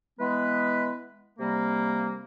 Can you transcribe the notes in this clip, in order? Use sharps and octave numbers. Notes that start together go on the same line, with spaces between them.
E3 G#3 B3 B4
C3 G3 A#3